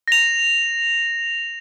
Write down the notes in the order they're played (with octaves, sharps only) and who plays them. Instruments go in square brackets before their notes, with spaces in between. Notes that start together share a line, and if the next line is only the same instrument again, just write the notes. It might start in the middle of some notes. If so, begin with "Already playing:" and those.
[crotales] A#6 F7